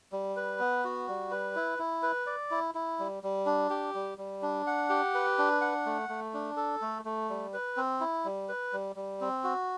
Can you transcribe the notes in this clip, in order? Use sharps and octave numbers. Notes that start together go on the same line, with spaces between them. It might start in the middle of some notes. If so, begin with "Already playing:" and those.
G3
B4
B3
F#4
G3
B4
E4
E4
B4
D5
E4
E4
G3
G3
D4
G4
G3
G3
D4
F#5
G4
B4
D4
F#5
A3
A3
D4
A4
A3
A3
G3
B4
C4
E4
G3
B4
G3
G3
C4
F#4